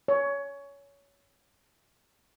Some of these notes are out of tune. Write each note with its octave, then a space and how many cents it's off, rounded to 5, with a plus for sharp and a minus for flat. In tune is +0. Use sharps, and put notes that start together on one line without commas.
C#5 +20